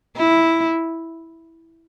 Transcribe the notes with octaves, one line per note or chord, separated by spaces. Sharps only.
E4